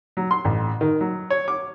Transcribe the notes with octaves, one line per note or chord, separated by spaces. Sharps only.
F#3
C6
A1
D#3
F#3
C#5
D6